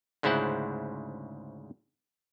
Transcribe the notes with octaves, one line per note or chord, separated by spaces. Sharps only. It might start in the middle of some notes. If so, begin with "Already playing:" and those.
D2 G#2 C#3 E4 C5 F#5